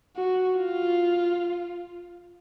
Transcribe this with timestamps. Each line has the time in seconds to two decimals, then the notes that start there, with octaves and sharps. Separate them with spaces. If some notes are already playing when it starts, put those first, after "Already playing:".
0.17 F#4
0.57 F4